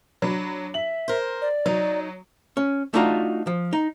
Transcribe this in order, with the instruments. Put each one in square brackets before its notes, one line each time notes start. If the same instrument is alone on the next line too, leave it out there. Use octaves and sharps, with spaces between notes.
[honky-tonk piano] F#3 D4 B5
[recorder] E5 [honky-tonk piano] F#7
[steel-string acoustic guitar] A#4 C5
[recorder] D5
[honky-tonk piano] F#3 [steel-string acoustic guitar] D#4
[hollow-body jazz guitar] C#4
A3 D4 D#4 F4 F#4
F3
D#4